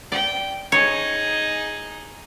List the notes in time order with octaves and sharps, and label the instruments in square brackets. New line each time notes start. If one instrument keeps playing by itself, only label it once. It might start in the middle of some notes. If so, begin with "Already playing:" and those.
[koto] D5 [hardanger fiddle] G5
[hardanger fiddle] D#4 G#4 [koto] C#5